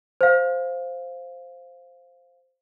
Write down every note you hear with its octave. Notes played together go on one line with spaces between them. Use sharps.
C5 F5